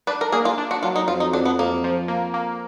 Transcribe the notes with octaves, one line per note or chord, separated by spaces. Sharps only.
D4 B4
A#4
A#3 G#4
F4
D4
F#4
F#3 F4
D#4
F2 F4
D#4
F2 D4
B3
F2 A#3
F3
A#3
A#3